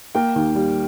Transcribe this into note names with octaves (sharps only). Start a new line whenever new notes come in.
A#3 G5
D#2
G3